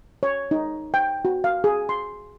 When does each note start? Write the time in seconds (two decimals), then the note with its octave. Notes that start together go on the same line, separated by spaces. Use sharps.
0.23 C#5
0.51 D#4
0.94 G5
1.25 F#4
1.44 F5
1.64 G#4
1.89 C6